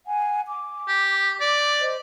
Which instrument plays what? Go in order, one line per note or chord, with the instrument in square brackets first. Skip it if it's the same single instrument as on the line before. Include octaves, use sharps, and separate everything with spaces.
[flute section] F#5 G#5
D6
[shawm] G4
D5
[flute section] C5 D#5